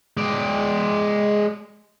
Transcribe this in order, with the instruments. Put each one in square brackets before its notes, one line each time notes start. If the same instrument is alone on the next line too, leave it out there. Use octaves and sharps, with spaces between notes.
[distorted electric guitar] G#3 D5